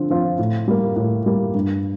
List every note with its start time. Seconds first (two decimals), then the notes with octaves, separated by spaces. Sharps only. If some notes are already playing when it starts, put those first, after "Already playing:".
Already playing: D3 F3 C4 F4
0.10 F3 C4 F4
0.39 A2
0.68 G3 A#3
0.96 A2
1.26 G3 A#3
1.55 G2